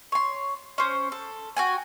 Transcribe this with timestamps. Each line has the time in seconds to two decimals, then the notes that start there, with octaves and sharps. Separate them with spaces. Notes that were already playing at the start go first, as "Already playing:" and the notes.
0.12 C#5 C6
0.78 C#4 C5
1.12 A4
1.57 F#4 G5 G#5